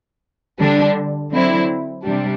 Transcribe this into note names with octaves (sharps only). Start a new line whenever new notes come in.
D3 G3 D4
D3 F#3 C4 E4
C3 G3 D4